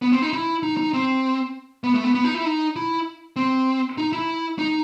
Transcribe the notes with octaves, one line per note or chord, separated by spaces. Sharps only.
B3
C4
D#4
E4
D#4
D#4
C4
B3
A3
B3
B3
D#4
E4
D#4
E4
C4
D#4
E4
D#4